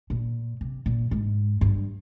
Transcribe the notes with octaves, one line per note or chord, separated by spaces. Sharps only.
A#2
C3
A#2
G#2
G2